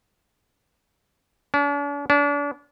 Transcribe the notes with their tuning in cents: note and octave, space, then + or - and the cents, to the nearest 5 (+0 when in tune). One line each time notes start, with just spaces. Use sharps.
D4 -45
D4 -35